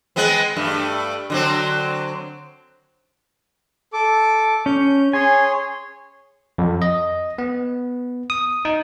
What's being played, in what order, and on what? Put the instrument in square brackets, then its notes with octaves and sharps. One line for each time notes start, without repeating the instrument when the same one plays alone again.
[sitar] G#3 B3 C4
G2 A3
D3 F#3 C4
[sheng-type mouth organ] A4 D6
[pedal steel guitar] C#4 [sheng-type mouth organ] G6
[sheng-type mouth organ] G#4 C#5 C6 [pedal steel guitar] G#5
[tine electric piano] F2
D#5
B3
D#6
D#4